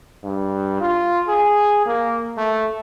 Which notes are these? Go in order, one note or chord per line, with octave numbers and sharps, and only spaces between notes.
G2
F4
G#4
A#3
A3